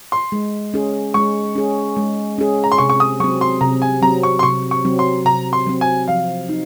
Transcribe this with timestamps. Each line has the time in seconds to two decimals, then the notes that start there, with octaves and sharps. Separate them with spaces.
0.12 C6
0.32 G#3
0.74 C#4 G#4
1.14 G#3 C#6
1.55 C#4 G#4
1.96 G#3
2.38 C#4 G#4
2.64 A#5
2.72 C6
2.78 C3 C#6
2.90 C#6
3.00 D#6
3.20 F#3 C4 C#6
3.41 C6
3.61 C3 A#5
3.82 G#5
4.02 F#3 C4 A#5
4.23 C#6
4.39 C6
4.43 C3 C#6
4.71 C#6
4.85 F#3 C4
4.99 C6
5.25 C3 A#5
5.53 C6
5.67 F#3 C4
5.81 G#5
6.08 F3 F5
6.49 D#4